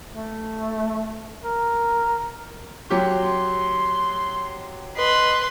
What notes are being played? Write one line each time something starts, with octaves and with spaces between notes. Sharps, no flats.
A3
A#4
F#3 G4 C6
B4 D#5 C6